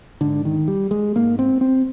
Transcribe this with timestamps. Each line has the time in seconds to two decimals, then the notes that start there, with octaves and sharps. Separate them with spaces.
0.21 G#2 D3
0.45 D#3
0.68 G3
0.91 G#3
1.15 G#2 A#3
1.39 C4
1.61 C4